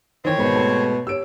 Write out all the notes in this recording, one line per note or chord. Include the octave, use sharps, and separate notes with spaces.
D#3 E3 C4 C5 C#5 G5
G#2 B2 D#3 B5
A3
G4 C#5 E6 D7